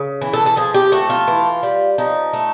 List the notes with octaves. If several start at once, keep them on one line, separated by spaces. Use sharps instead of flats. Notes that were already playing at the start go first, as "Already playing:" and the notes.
Already playing: C#3
E3
A4
A4
F3 G#4
G4
A3 F#4
F4
E3
G3
F3 D#4
A3